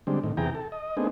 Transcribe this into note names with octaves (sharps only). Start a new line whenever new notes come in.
D3 G3 G#3 C4
A2 D#3
E2 C3 E3 G#4 G5 A#5
A4
D#5
A3 B3 C4 D4 D#4 G#4